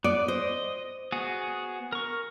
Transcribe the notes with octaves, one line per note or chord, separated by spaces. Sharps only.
B3 D5
C5 D#5
B3 F#4 G#4
A#4 C#6